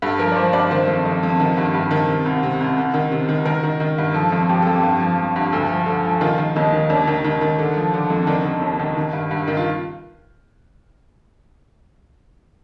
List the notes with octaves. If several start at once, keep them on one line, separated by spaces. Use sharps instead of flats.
G2 A4
F3 A#4
D5
F3 C5
G2 D5
D#3 C5
F2
F2
F2
D#3
G2
G2
D#3
C3
C2
C3
C2
C2
D#3
C3
D#3
D#3 A#4
D#3
D#3
G2
F3 A4
F2
F3 G4
F2 A4
G4
G2
F3
F3
G2
D2
F3
D3
F3
D#3 F4
D#3
D#2 D#4
D#3
D#2 D4
D#3
D#3
D#3
D3
F3
D3
F2
D#3 D4
D#3
D#2
D#3
D#3
G2
G2
D#3
F4